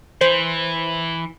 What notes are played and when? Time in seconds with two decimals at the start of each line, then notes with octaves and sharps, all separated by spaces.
0.21 E3 C5